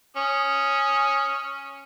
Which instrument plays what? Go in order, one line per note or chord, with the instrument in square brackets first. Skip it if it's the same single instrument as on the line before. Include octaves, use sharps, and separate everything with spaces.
[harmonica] C#4 D#6